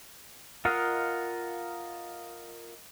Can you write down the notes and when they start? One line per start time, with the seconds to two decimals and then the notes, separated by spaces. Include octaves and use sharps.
0.65 F4 A#4 D#5 F5 F#5